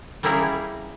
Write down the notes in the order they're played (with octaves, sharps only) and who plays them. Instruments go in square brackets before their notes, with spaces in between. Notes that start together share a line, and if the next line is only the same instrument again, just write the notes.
[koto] G3 A#3 C#4 E4 G#4 A#4